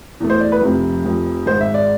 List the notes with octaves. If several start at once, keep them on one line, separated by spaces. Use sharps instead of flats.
E2 B2 A3
C5
D5
B4
F1 F2 C3
F1 F2 C3
G#1 G#2 G#3 C5
E5
D5